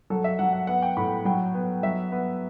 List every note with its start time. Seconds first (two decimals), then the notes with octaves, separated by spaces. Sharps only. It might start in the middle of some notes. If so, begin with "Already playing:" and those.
0.10 F#3 A4
0.24 E5
0.39 F#3 F#5
0.53 F#5
0.67 B3 F#5
0.82 G5
0.97 A2 B5
1.25 F#3 G5
1.54 B3
1.83 F#3 E5
2.12 B3